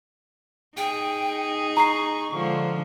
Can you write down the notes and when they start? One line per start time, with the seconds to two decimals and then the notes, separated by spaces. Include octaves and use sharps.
0.77 D#4 G#4 G5
1.77 A#5 C#6 C7
2.33 D3 F3 G#3